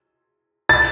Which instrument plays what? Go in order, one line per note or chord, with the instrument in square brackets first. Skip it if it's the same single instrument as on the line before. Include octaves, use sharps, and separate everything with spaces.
[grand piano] A6